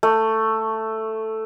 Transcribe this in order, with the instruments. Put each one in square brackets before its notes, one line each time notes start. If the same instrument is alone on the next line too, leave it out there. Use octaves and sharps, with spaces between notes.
[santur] A3